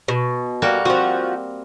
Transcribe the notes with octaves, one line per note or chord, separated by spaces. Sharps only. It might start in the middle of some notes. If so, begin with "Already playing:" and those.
B2
G3 A#3 F#4
F3 C4 F#4